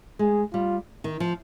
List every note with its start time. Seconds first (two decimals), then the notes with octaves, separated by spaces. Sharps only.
0.19 G#3 G#4
0.53 G3 F4
1.04 D#3
1.20 F3